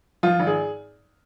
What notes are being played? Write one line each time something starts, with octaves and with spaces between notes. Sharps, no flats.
F3 F4
G#1
G#4